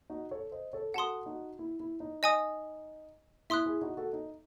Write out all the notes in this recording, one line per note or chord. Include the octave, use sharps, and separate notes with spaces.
D#4 F#4
A4 C#5
C5 D#5
A4 C#5
F#4 A4 F#5 A5 C6 D#6
D#4 F#4
E4
E4
D#4
D#5 G#5 D#6
E4 E5 C6 D#6 F#6
E4 G#4
D#4 F#4
F#4 A4
D#4